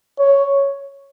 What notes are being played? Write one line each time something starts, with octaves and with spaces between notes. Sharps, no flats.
C#5